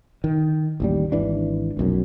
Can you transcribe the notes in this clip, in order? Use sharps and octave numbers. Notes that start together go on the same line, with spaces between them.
D#3
A1 D#2 G3
G#1 E3 D4
F1 B1 F#2